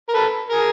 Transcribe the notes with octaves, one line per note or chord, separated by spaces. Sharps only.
A#4
A4 B4
G#4 A#4